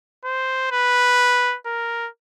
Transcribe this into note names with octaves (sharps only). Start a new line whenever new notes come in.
C5
B4
A#4